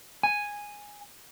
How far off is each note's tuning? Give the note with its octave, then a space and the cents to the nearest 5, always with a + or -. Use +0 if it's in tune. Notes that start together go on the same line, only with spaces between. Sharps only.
G#5 -5